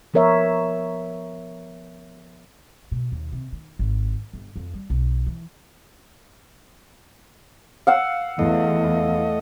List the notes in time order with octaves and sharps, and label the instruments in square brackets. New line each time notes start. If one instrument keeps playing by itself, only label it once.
[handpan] F3 B3 A#4 C#5 E5
[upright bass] B2
D#2
C3
D#3
G#1
G1
F2
G3
B1
E3
[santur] F5 F#5 E6
[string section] E2 [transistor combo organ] A3 D#5